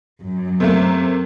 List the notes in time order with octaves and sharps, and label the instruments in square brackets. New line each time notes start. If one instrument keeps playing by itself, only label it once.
[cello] F#2
[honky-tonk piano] C3 A3 A#3